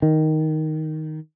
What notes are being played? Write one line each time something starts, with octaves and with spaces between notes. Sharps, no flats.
D#3